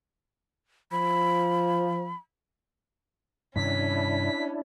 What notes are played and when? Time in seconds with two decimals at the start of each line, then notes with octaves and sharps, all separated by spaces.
0.92 F3 B5
3.56 G2 C3 D#3 C#4 D4 E4 B6